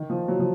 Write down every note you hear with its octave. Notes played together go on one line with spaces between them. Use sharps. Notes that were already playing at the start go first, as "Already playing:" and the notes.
Already playing: D#3
F3
F#3
F3